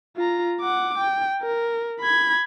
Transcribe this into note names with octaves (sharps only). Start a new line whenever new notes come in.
F4 A#5
F#5 D6
G5
A#4
B5 G#6